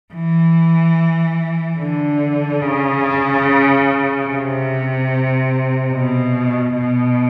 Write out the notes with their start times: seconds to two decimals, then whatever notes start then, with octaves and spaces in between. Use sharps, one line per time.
0.14 E3
1.79 D3
2.61 C#3
4.27 C3
5.93 B2
6.74 B2